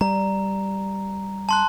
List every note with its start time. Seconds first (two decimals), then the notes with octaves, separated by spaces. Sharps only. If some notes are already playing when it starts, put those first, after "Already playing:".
0.01 G3 A#5
1.49 A5 C6 F#6